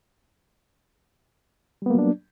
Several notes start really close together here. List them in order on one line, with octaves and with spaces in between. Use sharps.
G3 B3 A#3 F#3 D4